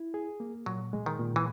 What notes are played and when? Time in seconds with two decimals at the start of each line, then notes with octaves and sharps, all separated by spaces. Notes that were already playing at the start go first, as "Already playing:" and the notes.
Already playing: E4
0.14 G#4
0.40 A#3
0.66 A#2 F#3
0.93 G#3
1.06 D#3
1.19 A#2
1.36 E3